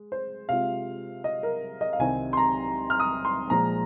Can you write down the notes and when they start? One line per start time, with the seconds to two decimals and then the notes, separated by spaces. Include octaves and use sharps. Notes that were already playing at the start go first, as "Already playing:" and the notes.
Already playing: G#3
0.12 C5
0.49 C3 G#3 F4 F5
1.24 D#5
1.43 A#4
1.81 D#5
1.93 F5
1.99 C2 C3 D#3 C4 D#4 G#5
2.33 C6
2.37 A#5
2.90 F6
3.00 D#6
3.25 C6
3.50 A#2 F3 G#3 A#5